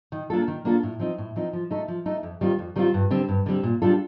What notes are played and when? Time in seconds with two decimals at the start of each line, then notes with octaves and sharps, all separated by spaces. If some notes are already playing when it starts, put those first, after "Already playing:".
0.12 D#3
0.30 A#3 D4 F4 A4
0.48 D#3
0.65 A#3 D4 F4 A4
0.83 A2
1.00 F3 C4 D#4
1.18 A2
1.36 F3 C4 D#4
1.53 F3
1.71 A3 D#4 A4
1.88 F3
2.06 A3 D#4 A4
2.23 F2
2.41 D#3 G3 C4 F4
2.59 F2
2.76 D#3 G3 C4 F4
2.94 G2
3.11 D3 G3 C4
3.29 G2
3.46 D3 G3 C4
3.63 A#2
3.82 G3 D4 F4 A4